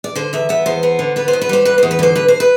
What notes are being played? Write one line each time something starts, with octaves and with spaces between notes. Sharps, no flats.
D5
D3 C5
E2 E5
B3 E5
E2 C5
B3
D3
B3 B4
C5
E2
B4
G3 C5
E2 B4
E2 C5
B4
D3 C5
G2 B4
C5
B4